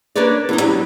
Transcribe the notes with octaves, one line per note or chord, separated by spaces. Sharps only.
A#3 D4 A#4 B4 C#5 D5
E2 A3 D#4
D3 F#3 G3